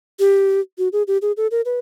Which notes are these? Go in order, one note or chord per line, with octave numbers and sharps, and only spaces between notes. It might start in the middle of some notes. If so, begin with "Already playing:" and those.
G4
F#4
G#4
G4
G#4
A4
A#4
B4